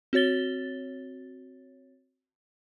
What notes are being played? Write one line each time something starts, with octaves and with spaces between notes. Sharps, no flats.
C4 F#4 C#5 A6 G7